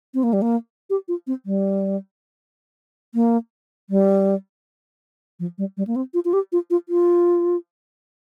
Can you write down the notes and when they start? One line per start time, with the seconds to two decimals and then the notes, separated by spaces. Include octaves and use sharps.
0.14 C4
0.23 A#3
0.33 G3
0.42 A#3
0.90 G4
1.08 F4
1.27 C4
1.46 G3
3.15 A#3
3.90 G3
5.39 F3
5.58 G3
5.77 G3
5.87 A#3
5.96 C4
6.14 F4
6.25 F4
6.33 G4
6.52 F4
6.70 F4
6.89 F4